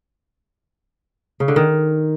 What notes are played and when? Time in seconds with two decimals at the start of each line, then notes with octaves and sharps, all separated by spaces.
1.40 C#3
1.48 D3
1.56 D#3